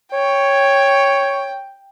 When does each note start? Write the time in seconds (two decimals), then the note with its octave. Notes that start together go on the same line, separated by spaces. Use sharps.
0.13 C#5 G5